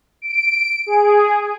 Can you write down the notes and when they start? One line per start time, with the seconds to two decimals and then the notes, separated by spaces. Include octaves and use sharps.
0.22 D7
0.86 G#4